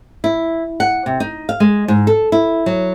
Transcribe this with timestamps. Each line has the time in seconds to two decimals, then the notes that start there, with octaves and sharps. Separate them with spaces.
0.24 E4
0.80 F#5
1.06 C3
1.20 D#4
1.49 F5
1.60 G#3
1.88 G#2
2.07 A4
2.32 E4
2.66 F#3